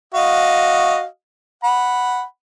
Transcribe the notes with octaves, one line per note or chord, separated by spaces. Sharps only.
F#4 D#5 F5
F#5 B5